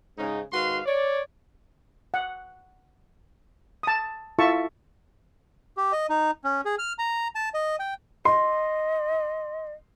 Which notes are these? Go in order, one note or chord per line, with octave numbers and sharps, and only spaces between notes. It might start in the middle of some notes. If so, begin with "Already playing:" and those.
G#2 C#3 D#4
G#2 D#3 F#4 B4 F5 C6
C#5 D5
F#5
A5 D#6
E4 F4 A4 E5 A5 C#6
G4
D#5
D#4
C#4
G#4
F6
A#5
A5
D#5
G5
D#5 C6